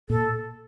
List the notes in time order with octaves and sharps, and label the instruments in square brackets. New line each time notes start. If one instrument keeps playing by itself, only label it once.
[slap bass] A#2 [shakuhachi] A4